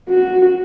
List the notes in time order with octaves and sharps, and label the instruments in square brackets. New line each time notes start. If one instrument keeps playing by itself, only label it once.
[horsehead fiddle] F#4